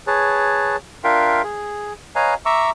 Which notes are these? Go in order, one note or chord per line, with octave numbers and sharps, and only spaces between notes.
G#4 B4 C#5 A5
D4 F4 A#4 E5 F5 G5
G#4
B4 C#5 D#5 F5 G#5 A#5
E5 A#5 C#6 D6 E6